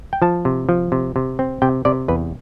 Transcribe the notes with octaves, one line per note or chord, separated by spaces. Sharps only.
G5
F3 A5
C3
F3
C3
C3
C4
C3 G5
C3 D5
E2 B4